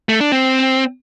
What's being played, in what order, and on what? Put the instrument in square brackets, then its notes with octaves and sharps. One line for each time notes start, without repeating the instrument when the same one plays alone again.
[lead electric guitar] A3
D4
C4